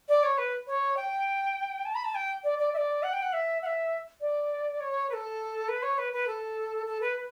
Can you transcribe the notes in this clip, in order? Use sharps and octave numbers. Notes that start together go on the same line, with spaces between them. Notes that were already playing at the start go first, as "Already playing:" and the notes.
D5
C#5
B4
C#5
G5
A5
B5
A5
G5
D5
D5
E5
D5
F#5
G5
F#5
E5
F#5
E5
D5
C#5
B4
A4
B4
C#5
B4
B4
A4
A4
B4
B4